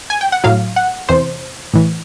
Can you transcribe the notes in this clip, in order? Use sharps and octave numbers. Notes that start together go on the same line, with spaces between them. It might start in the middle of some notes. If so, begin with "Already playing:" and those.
G#5
G5
F#5
A2 F#3 F5
F#5
E2 C3 E3 C5
A2 E3